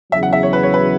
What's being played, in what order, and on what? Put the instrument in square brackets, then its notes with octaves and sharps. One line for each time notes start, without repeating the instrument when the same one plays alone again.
[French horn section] E2 C#3 F#3 [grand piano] E5
[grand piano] F#5
E5
C#5
B4
C#5
B4